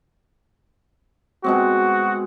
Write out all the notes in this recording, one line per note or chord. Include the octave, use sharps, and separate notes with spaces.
B2 G#3 C4 F#4